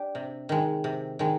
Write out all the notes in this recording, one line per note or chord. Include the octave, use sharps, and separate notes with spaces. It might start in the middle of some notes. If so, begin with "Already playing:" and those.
Already playing: D4 G4
C3
D#3 G#3
C3
D#3 G#3